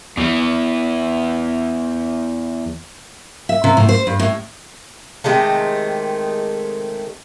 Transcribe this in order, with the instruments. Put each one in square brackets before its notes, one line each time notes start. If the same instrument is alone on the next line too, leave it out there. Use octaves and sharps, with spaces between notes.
[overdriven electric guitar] E2 E3
[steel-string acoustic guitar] E5
C3
A2
C5
G2
A2
[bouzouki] C3 D#3 G#3 A3